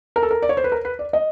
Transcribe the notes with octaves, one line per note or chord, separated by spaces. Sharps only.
A#4
A4
A#4
D5
C#5
C5
B4
A#4
B4
D5
D#5